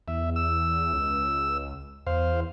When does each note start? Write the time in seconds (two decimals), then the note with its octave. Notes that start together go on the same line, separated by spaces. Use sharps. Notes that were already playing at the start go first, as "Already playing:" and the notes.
0.08 E2 E5
0.36 E6
0.93 C#2
2.07 E2 C5 F5